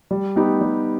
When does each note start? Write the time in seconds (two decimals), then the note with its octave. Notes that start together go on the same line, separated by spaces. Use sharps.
0.11 G3
0.36 B3 D#4 G4
0.61 G3